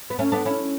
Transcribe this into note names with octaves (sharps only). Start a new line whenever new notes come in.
B3
A3 C#4
B3 D4
C#4 E4